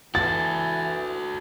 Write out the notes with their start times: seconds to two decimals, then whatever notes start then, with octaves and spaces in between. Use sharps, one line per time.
0.15 E3 F#4 A4 A6